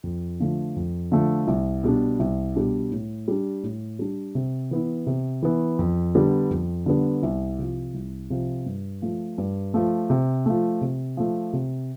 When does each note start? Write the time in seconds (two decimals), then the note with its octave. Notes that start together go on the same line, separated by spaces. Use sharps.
0.03 F2
0.40 D3 F3 A3
0.76 F2
1.12 D3 F3 A3
1.47 C2
1.84 B2 G3 D4
2.19 C2
2.56 B2 G3 D4
2.92 A2
3.28 G3 D4
3.63 A2
3.99 G3 D4
4.35 C3
4.71 E3 B3 E4
5.07 C3
5.43 E3 B3 E4
5.79 F2
6.15 D3 G3 B3 D4
6.50 F2
6.86 D3 G3 B3 D4
7.23 C2
7.59 C3 F3
7.94 C2
8.30 C3 F3
8.66 G2
9.02 F3 A3
9.38 G2
9.74 F3 A3
10.10 C3
10.46 F3 A3
10.81 C3
11.17 F3 A3
11.53 C3